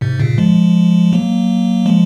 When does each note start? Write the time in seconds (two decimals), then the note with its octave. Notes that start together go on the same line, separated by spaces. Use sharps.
0.01 G#2 C3
0.20 A#2 C#3
0.38 F3 G#3
1.13 F#3 A#3
1.86 F3 G#3